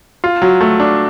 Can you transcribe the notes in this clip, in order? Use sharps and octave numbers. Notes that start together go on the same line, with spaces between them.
F4
F#3
A3
D4